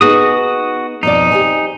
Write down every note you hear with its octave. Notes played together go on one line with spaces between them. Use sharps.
B3 D#4 F#4 G#4 D#6
F2 B2 D#4 D5
G4 C5 G#5